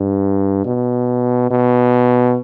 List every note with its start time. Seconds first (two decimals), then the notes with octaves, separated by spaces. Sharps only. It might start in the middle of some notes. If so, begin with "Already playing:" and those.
Already playing: G2
0.66 B2
1.51 B2